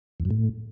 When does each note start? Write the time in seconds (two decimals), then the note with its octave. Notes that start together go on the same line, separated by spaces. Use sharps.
0.20 E2
0.25 F#2
0.30 A2